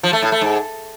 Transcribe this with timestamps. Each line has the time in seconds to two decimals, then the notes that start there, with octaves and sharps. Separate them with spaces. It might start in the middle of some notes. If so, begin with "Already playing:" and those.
0.03 F3
0.13 A3
0.22 A2
0.32 A3
0.41 G#2